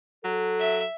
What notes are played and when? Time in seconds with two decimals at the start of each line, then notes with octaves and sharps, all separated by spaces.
0.24 F#3 A4
0.60 E5